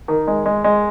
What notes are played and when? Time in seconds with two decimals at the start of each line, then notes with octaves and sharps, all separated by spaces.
0.08 D#3
0.27 G#3
0.46 G#3
0.64 G#3